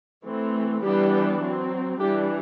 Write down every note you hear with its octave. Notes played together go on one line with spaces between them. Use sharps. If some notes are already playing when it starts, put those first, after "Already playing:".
E3 A3 C4
E3 G3 B3 D4 G4
F#3 C4
E3 G3 D4 G4